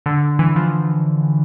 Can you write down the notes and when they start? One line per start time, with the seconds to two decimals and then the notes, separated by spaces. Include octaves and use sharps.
0.06 D3
0.39 E3
0.56 F3